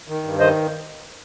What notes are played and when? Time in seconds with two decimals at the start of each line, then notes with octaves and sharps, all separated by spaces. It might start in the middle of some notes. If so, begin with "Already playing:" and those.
0.08 D#3
0.24 G2
0.39 D#3 C5 D#5